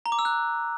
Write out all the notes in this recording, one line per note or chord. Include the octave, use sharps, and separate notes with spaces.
A#5
D6
E6
F#6